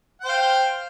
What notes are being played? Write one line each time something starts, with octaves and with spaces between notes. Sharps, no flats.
C5 F5 G5